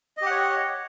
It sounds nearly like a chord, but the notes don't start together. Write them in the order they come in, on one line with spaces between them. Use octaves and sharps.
D#5 G4 F#5 C#5